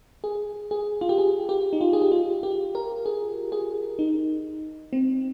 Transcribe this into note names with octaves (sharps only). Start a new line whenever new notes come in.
G#4
G#4
F4
G4
G#4
G4
D#4
F4
G#4
G4
F4
G4
A#4
G#4
G#4
D#4
C4